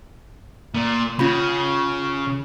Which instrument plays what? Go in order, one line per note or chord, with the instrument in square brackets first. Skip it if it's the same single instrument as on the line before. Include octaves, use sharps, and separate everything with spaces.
[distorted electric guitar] A#2
[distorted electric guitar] C#3 [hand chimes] C#4 F4 B5